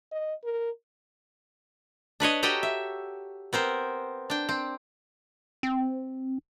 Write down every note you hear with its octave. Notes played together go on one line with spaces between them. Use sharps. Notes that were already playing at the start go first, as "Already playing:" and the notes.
D#5
A#4
D4 B4 C#5 D#5
F#4 G4 A4 D#5 G5 A#5
E5
B3 C4 A#4 C5
D4 G5
C4
C4